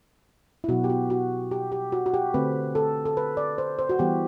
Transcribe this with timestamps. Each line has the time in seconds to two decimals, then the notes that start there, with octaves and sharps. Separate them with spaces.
0.64 E4
0.68 B2 F#3 B3 F#4
0.84 G4
0.90 F#4
1.10 F#4
1.51 G4
1.72 G4
1.92 F#4
2.06 F#4
2.14 G4
2.34 D3 A3 C4 B4
2.75 A4
3.05 A4
3.17 B4
3.37 D5
3.58 C5
3.79 C5
3.89 F#4
3.99 E3 G3 B3 G4